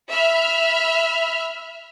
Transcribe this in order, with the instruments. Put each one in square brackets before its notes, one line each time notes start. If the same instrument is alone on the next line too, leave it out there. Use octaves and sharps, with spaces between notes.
[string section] E5 B5 F6